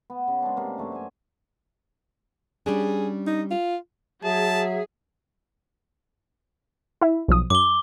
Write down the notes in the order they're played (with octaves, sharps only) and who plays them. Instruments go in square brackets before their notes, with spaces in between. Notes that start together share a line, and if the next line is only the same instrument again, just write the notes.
[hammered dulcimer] B3
C#3
G#3 C4 D4
C3 A#3
F#2 A3 C#5 D6
C5 G#5
[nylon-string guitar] G3 C#4 D4 [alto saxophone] G#4
[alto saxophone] D#4
F4
[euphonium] F#3 [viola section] G#4 [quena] E5 [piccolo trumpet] A5
[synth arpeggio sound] E4 E5
B1 F3 D#6
[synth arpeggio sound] F#2 [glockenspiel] D6 G7